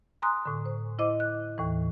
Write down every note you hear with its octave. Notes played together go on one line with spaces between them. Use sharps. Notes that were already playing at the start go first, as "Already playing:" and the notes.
G#5 A#5 C6 D#6 F#6
A2 D3
C5
E4 C5 D#5 D6
F#6
D#2 A2 E3